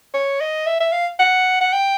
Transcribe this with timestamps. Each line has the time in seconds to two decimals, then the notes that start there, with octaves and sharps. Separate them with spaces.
0.14 C#5
0.41 D#5
0.67 E5
0.80 E5
0.93 F5
1.19 F#5
1.61 F#5
1.73 G5